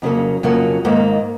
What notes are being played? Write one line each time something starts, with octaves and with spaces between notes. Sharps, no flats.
F2 C#3 F#3 A#3 C#4
F2 C#3 F#3 A#3 C#4
G#2 D#3 A#3